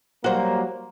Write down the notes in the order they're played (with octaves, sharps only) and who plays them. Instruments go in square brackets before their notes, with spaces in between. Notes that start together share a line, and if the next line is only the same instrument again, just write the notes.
[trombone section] F#3 G3 A#3 [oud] F#4 C5